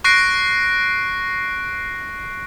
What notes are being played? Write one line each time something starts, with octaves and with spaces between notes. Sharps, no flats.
C#6 F#6 A#6 C7 D7